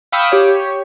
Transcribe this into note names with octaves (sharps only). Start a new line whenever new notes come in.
F5 G5 B5 C#6 D#6 E6
G4 C#5